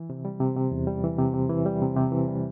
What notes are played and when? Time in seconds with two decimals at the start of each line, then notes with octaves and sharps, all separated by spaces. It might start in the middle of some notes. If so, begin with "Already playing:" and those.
Already playing: E3
0.10 C3
0.25 G3
0.40 C3
0.56 C3
0.72 E2
0.87 G3
1.04 E3
1.19 C3
1.34 C3
1.49 E3
1.66 G3
1.82 C3
1.96 C3
2.12 E3
2.28 G3